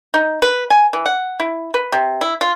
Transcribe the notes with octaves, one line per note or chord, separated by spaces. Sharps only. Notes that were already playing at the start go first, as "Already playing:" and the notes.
D#4
B4
G#5
E3
F#5
E4
B4
C3
E4
F4